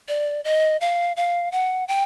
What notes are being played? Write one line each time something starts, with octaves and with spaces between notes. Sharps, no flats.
D5
D#5
F5
F5
F#5
G5